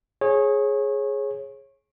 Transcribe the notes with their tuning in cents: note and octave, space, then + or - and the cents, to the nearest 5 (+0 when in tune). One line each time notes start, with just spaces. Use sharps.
G#4 +10 C#5 -25